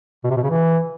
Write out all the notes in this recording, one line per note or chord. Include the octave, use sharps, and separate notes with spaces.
B2
C3
B2
C#3
E3